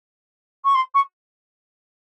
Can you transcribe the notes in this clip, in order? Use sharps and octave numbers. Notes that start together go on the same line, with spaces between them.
C#6
C6
C#6